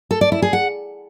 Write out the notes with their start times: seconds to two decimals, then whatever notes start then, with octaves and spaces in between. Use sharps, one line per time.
0.11 A4
0.21 D5
0.32 E4
0.42 G#4
0.53 F#5